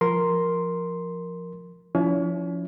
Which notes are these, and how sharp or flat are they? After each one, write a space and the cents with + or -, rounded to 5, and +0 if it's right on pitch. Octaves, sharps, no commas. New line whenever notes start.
F3 +0 A#4 +0 C6 +0
F3 +0 C#4 +40 E4 +0